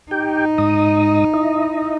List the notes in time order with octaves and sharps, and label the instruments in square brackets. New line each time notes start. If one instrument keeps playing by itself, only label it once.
[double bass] D#4 [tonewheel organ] G4 G5
[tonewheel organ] G#2 D#5 D#6
E4 D#5